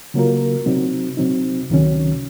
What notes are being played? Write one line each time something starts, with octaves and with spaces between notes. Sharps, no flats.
C#3 F#3 A#3 F4 A#4
C3 F#3 C4 D#4
C3 F#3 C4 D#4
C#2 C3 D#3 F#3 C#4